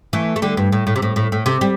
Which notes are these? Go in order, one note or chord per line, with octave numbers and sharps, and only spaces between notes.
E3 A3
A3
D3 G3
G2
A2
A2
C3
A2
A2
A2
C3
G3